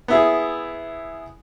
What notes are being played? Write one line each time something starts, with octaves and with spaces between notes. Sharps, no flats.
B3 E4 G#4